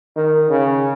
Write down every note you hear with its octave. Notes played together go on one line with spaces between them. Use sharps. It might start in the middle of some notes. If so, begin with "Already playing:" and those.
D#3
C#3